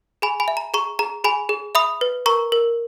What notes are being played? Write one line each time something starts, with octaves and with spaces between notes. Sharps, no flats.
G#4 G#5 B5
G#5 B5
E5
A#5
G#4 A#5 C#6
G#4 A#5
G#4 G#5 B5
G#4
E5 B5 D#6
B4
A#4 A#5 C#6
A#4